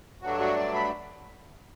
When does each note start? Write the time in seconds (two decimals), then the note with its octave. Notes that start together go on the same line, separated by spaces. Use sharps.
0.22 G2 F#3 A3 D4 F#4
0.40 F#4
0.57 D5
0.74 B5